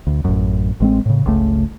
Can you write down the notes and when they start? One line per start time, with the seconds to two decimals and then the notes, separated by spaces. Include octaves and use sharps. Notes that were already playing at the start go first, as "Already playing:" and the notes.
0.07 D2
0.25 A1 F#2
0.80 A1 G#3 C4
1.06 A2 C#3
1.24 G1 C#2 D3 A3